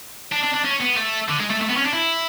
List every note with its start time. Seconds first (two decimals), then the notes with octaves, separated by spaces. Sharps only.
0.32 D4
0.43 D4
0.54 D4
0.64 C#4
0.81 B3
0.97 A3
1.29 D3
1.40 G#3
1.50 A3
1.61 A3
1.69 B3
1.77 C#4
1.85 D4
1.93 E4